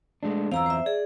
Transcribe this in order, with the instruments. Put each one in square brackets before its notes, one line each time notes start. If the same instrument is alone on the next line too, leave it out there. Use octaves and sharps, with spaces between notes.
[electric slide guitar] G#3 A3 D4
[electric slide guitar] E2 C4 [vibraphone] F5 A#5 E6
[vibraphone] C5 E5
[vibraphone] G#4 [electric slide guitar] D5